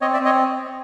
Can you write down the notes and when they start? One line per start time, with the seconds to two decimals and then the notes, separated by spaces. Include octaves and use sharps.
0.01 C4 C#5 D#5
0.13 D5 E5
0.20 C4
0.25 C#5 D#5